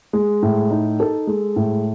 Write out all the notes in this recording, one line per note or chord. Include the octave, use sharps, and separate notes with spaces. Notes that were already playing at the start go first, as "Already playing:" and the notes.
G#3
A2
D#4
A4
G#3
A2